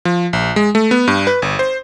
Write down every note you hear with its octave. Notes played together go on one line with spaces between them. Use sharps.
F3
A#1
G#3
A3
B3
G2
B4
G1
C5